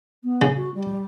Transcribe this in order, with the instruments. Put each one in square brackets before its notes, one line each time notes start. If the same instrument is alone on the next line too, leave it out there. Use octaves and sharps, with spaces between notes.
[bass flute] B3
[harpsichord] C#3
[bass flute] F#4
G3